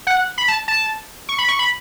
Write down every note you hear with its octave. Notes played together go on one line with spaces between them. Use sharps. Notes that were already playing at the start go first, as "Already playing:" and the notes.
F#5
B5
A5
A5
C#6
B5
C#6
B5